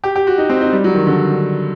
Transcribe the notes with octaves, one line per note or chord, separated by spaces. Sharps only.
G4
G4
F#4
D#4
C4
D#4
G3
F#3
D#3
D3